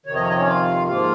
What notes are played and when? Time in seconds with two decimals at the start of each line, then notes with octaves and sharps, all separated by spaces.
0.06 F2 C3 D#3 C#5
0.14 D#5
0.21 C#5
0.29 D#5
0.36 C#4 C#5
0.46 F4 F5
0.87 G#2 F3 A#3 F4 F5